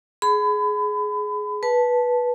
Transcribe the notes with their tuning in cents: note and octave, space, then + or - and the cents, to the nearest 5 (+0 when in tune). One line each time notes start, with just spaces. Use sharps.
G#4 +15 B5 +30
B4 -10 A5 -10